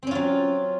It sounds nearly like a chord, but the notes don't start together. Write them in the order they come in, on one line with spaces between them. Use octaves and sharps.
C4 C#4 F4 F#3